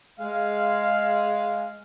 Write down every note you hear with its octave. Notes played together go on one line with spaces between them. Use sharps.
G#3 F5